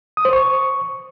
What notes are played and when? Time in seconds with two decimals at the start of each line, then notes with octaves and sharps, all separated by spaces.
0.17 D#6
0.25 C5
0.33 C#6